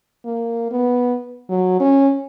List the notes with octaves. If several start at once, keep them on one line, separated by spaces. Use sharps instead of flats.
A#3
B3
F#3
C#4